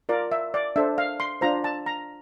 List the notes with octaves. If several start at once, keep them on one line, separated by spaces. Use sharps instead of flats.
F4 A#4 D5
E5
D5
D4 A4 C5 E5
F5
C6
D4 F4 C5 A#5
A5
A#5